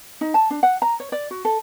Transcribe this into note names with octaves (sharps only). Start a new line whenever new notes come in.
D#4
A5
D4
F#5
A#5
C#5
D5
F#4
A4